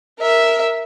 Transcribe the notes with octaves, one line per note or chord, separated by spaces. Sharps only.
A#4 E5